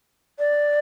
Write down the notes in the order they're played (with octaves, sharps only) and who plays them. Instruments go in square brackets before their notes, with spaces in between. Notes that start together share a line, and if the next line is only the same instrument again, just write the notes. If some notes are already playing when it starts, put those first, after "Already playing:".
[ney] D5